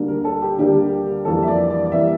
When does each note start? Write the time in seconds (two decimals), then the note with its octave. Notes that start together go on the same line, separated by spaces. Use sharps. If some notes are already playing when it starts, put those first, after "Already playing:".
Already playing: D2 D3 G3 A#3
0.08 A#4
0.24 A4
0.42 G4
0.58 D2 D3 G3 A#3 G4
1.25 F2 E3 G3 A#3 A4
1.43 E5
1.48 D5
1.70 D5
1.85 D5
1.92 E3 G3 A#3 E5